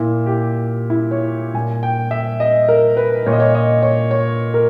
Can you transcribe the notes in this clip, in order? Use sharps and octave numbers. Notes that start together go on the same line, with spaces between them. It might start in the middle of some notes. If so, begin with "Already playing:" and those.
Already playing: A#2 E4
G4
E4
C#5
A#2 G#5
G5
E5
D#5
A#4
B4
A#2 C#5
D#5
C#5
D#5
C#5
C#5
A#4